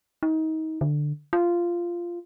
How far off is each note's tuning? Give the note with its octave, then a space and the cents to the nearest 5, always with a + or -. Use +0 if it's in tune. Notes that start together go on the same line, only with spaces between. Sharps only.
D#4 +30
D3 +10
F4 -10